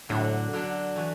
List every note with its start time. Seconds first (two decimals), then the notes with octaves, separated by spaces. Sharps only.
0.09 A2 D3 F#3 D4
0.53 D3 F#3 D4
0.96 E3 A3 F#4